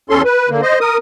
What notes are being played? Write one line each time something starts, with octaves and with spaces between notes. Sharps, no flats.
E2 C#4 A4 C6
B4
D3 A#3
C5 D#5
A#4 D#6